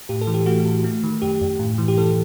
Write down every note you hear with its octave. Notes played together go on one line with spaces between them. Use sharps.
A2 G4
A4
E3
G4
A3 F#4
A2
A3
D#3
F#2 G4
F#2
A2
E3
G4
E3 A4